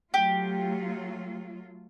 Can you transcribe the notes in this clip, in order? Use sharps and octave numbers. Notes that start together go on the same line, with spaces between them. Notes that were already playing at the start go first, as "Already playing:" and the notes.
F#3 A3 F4 G4